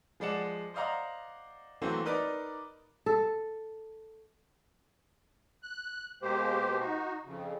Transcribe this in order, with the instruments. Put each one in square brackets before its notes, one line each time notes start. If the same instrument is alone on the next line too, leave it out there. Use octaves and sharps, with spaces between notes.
[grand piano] F3 G#3 D5 F#5 E7
C5 D5 D#5 F5 F#5 A#5
E3 F#3 A3 A#3 C4 F#4
D#4 A#4 B4 D5
[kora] A4
[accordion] F#6
B2 G#3 A#3 G4 C5
D#4 F#4
F2 C#3